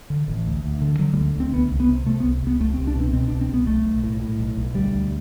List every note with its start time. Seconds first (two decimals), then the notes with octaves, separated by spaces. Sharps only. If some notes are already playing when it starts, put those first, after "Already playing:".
0.10 D3
0.28 A1
0.46 D2
0.64 D2
0.81 D3
0.99 D3 F#3
1.13 G3
1.17 D2
1.35 D2
1.40 C4
1.53 C2 B3
1.71 C2
1.80 B3
1.88 C3
2.06 C3 A3
2.20 B3
2.24 C2
2.43 C2 B3
2.60 C2 A3
2.74 C4
2.78 C2
2.87 D4
2.96 B2 C4
3.13 B2 C4
3.28 D4
3.32 C2
3.41 C4
3.49 C2 B3
3.67 B1 A3
3.85 B1
4.03 A2
4.21 A2
4.39 B1
4.57 B1
4.74 D2 G3
4.92 D2